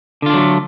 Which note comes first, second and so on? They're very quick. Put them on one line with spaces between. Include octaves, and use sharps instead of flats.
D3 F4 D4 F#3 A3